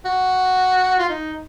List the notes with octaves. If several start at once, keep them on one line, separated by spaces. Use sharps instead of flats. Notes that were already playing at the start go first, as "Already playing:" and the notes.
F#4
F4
D#4